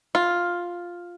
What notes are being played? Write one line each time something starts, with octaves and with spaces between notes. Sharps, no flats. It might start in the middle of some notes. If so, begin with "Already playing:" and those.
F4